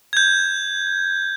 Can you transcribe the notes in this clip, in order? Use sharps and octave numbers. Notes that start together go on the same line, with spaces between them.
G6 G#6